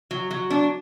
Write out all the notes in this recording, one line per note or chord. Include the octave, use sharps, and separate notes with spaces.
F#3
F#3
D4